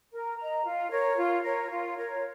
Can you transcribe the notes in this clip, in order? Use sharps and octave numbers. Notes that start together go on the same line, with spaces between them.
A#4
D#5 A#5
F4
A#4 C#5
F4
A#4 C#5
F4
A#4 C#5